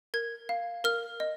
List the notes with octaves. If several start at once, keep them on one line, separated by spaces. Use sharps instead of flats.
A#4 G#6
F5
A#4 F6
D#5